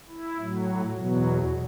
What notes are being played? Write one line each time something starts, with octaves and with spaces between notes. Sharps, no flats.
E4
A2 F#3
E2 B2 F#3